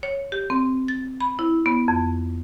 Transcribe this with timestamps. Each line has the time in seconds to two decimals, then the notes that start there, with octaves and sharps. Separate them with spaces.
0.03 C#5
0.32 G4
0.50 C4
0.88 A6
1.21 B5
1.39 E4
1.66 B3
1.88 F2